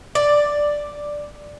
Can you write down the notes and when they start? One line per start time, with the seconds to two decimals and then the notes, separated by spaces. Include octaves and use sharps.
0.15 D5